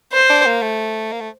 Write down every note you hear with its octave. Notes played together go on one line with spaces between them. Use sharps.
C5
D4
A#3
A3
A#3
A3